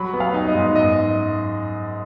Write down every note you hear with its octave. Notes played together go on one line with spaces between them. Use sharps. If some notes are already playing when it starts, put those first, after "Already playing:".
Already playing: F#3 B5
B3
F5
D#4
D#5
G#2
F#2 D#5